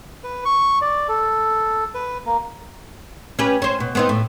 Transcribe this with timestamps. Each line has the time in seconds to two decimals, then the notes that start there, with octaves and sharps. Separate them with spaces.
0.24 B4
0.45 C#6
0.82 D5
1.08 A4
1.95 B4
2.26 A#3
3.39 C#4 G4 B4
3.62 C#4 C5
3.80 B2
3.95 B3 C4 D#4
4.09 A2